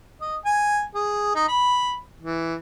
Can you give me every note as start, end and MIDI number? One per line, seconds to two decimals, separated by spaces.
0.21 0.36 75
0.45 0.82 80
0.95 1.33 68
1.35 1.45 63
1.48 1.96 83
2.22 2.55 52